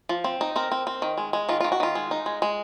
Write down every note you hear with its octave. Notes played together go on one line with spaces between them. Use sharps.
F3
C4
D#4
C4 A#4
C4
C4
D#3
G#3
G#3
D#3 F4
D#3 F4
F#4
D#3 F4
G#3
D#4
G#3
G#3